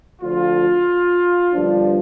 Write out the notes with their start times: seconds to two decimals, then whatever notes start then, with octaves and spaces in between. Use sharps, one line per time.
0.21 D2 D3 F3 F4
1.53 G1 G2 F3 D4